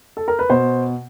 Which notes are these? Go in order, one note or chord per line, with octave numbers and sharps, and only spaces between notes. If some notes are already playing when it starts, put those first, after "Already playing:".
A4
A#4
B4
B2 C5